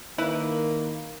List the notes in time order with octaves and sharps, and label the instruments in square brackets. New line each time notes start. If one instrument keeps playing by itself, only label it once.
[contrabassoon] D#3 [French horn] A#3 [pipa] E4 B4